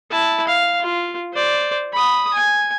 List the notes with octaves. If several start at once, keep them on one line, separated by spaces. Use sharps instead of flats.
E4 A5
F5
F4
C5 D5
B5 D#6
G#5